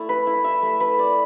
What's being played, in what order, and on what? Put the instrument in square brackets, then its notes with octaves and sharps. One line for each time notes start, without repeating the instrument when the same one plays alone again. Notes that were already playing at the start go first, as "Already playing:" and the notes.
Already playing: [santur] A3 E4
B4
E4
E5
A3
B4
D5